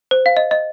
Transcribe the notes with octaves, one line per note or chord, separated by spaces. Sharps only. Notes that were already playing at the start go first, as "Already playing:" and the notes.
C5
F5
D#5
D#5